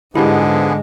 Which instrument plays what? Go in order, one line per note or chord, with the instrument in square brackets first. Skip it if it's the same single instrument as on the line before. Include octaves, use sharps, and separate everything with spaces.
[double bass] G#2 G#3 [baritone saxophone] D3 [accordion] F3 B3 G#4 [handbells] E4 G4